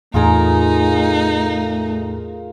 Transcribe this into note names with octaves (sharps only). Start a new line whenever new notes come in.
E2 A2 A3 D#4 F4 G#4 A#4